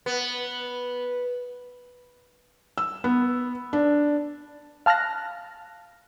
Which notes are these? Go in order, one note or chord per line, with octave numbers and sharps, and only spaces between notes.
B3
E6
B3
D4
F5 A5 F6 F#6 A#6